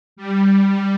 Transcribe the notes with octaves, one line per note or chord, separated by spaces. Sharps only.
G3
G3